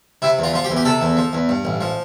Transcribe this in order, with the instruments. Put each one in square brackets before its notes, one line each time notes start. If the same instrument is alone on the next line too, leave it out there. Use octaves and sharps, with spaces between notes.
[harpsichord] C3 E4
E2 F4
F3 F4
G4
E2
G4
C3 A4
E2
F3
E2
G2
A1
F3